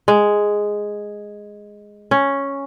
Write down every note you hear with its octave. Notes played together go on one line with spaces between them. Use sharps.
G#3
C#4